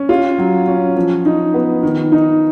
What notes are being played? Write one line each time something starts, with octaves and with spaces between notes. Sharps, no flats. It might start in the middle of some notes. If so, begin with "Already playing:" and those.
Already playing: C#4
F4
F#3
C#4
F3
D#4
B3
D#3
D#4